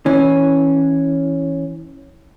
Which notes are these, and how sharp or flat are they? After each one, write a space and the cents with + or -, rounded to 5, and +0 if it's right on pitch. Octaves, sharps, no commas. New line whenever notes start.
E3 -15 C#4 -5